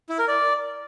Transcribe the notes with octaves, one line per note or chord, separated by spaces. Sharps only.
E4
A#4
D5